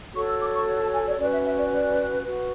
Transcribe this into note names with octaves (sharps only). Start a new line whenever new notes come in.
F#4 A4 C#5 C#6
E6
D6
C#6
A5
G#5
D5
C#4 F#4 B4 D5
E5
E5
D5
D5
F#4 B4